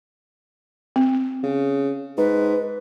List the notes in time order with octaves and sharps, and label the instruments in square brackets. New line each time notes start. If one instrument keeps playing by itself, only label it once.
[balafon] C4
[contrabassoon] C#3
[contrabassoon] G#2 [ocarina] B4